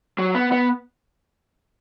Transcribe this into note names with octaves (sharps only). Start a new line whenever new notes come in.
F#3
B3
B3